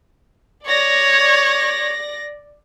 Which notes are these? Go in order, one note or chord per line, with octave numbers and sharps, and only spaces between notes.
C#5 D5 A#6